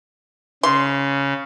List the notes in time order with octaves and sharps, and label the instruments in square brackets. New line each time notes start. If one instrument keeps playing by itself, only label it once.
[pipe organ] C#3 [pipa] C6